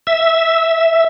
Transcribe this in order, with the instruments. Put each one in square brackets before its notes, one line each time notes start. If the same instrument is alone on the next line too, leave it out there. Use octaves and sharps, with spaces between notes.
[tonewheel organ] E5